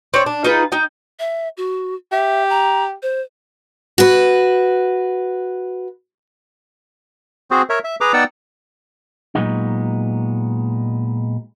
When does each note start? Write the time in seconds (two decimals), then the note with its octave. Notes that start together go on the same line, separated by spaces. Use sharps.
0.14 C4 C#5 D5
0.26 D4
0.44 D#4 F4 G#4 B4
0.72 D#4 G5
1.19 E5
1.57 F#4
2.12 G4 E5
2.50 A#5
3.03 C5
3.98 F#4 B4
7.51 C4 F#4 G#4 C5
7.70 A#4 C#5 E5
7.84 E5
8.01 G#4 B4 A#5 D6
8.13 B3 D#4 D5 F#5 G5 E6
9.35 A#2 C#3 F#3 G#3 B3 D#4